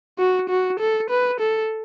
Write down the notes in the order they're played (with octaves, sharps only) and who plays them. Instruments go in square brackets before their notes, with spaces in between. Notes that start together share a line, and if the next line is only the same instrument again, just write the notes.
[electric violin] F#4
F#4
A4
B4
A4